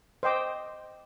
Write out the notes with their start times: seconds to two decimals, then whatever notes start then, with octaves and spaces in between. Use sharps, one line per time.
0.23 C5 D#5 G5 D6